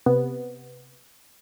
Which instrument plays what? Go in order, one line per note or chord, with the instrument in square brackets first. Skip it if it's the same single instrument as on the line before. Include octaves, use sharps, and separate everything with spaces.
[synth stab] C3 B3